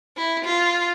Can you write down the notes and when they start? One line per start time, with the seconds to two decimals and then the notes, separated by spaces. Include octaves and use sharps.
0.17 E4
0.45 F4